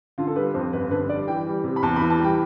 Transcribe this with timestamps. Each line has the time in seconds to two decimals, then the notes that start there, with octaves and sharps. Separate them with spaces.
0.18 D3 F4
0.27 A4
0.36 G3 B4
0.54 F2 C5
0.73 G1 B4
0.91 D3 B4
1.09 G3 D5
1.27 E3 G5
1.46 G3
1.64 C3
1.76 B5
1.83 E2 A5
1.96 B5
2.02 E3
2.10 A5
2.20 G3 G5